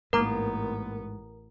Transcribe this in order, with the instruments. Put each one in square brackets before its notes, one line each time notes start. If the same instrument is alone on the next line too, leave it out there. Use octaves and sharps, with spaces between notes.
[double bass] A1 B3 [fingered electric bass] G#2 [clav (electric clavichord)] A#3 [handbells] A#4 A#5